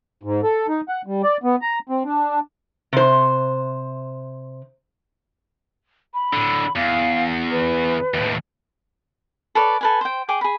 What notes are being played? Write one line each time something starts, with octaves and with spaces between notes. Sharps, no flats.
G#2
A4
D#4
F#5
G3
D5
B3
A#5
C4
D4
C3 C5
B5
A2 D3
E2 F5
B4
D#2 A2
A4 B4 C#5 D5
A4 B4 G#5
C5 G5
G#4 G5 D6
G#4 B5